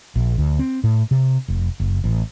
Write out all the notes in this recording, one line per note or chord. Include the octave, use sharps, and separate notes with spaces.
A#1
D2
C4
A2
C3
F1
F#1
A1